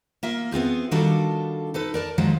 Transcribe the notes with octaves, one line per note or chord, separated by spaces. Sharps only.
A#3 F4 E5
B3 C4 F4 G#4
D#3 G3 D4 F4 F#4 A4
D#4 A4 B4
A#4 D5 A5
D#3 F3 F#3 G#3